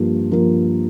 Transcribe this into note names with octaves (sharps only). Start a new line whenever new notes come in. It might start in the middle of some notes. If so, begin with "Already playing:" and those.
Already playing: G2 F3 A#3 F4
G2 F3 A#3 F4 A#4